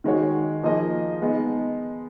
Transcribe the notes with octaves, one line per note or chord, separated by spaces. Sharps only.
D#3 G#3 D#4 F#4 C#5
F3 A#3 D#4 G#4 D#5
G#3 B3 D#4